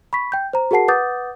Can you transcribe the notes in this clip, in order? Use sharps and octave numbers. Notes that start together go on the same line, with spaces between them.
B5 C#6 B6
G5 G6
C5 A#5
F#4 G#4 A#4 F#5 A5 C7
B4 F#5 D6 D#6 G6 A6